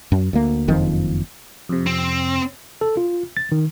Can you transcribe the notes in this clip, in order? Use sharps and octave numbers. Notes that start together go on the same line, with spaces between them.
F#2
D2 A#3
F#1 F2 D#3 F3
F2 C3
C4
A4
F4
A6
D#3